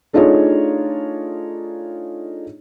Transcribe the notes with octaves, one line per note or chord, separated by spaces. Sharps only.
A3 D4 D#4 F4 G#4 C#5